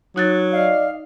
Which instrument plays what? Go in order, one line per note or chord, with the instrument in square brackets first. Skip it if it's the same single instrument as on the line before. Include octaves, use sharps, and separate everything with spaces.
[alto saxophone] F#3 [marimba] D#4 F#6 A6
[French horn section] D5 D#5 [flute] F5